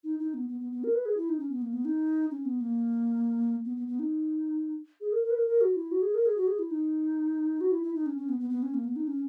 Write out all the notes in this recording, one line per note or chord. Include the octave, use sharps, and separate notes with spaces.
D#4
D#4
B3
B3
B3
B3
A#4
B4
G#4
E4
D#4
C#4
B3
A#3
B3
D#4
C#4
B3
A#3
B3
B3
B3
D#4
G#4
A#4
A#4
B4
A#4
A#4
F#4
E4
F#4
G#4
A#4
G#4
F#4
G#4
E4
D#4
F#4
E4
E4
D#4
C#4
C#4
B3
B3
B3
C#4
A#3
B3
D#4
C#4